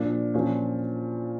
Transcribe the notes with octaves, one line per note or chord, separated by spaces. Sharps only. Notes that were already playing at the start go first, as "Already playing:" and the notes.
Already playing: A#2 F3 D4
A#2 F3 C#4